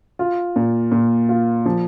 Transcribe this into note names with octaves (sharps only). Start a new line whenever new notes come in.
F4
A#2
A#2
F4
F3